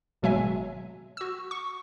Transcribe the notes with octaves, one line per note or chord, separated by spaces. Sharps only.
G#1 B2 F#3 G#3 E5 G#5
F#4 E6
C#6